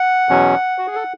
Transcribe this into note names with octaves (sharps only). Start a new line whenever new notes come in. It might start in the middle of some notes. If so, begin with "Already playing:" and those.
Already playing: F#5
E2 B2 F#3 C#4
F#4
G#4
A4